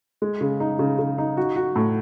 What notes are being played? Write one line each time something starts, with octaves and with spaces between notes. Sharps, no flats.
G#3
C#3
D#4
C#3
C#3
D#4
F#4
F#4
A2